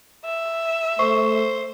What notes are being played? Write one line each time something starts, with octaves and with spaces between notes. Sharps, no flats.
E5
A3 C5 C#6